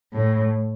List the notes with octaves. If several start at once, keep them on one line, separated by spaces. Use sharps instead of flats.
A2